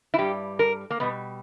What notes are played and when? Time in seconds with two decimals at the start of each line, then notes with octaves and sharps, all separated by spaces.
0.14 E4
0.18 G2 G3 G4
0.59 A#4
0.90 A#3
1.00 B2 G3 B3